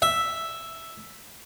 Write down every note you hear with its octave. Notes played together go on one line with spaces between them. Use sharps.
E5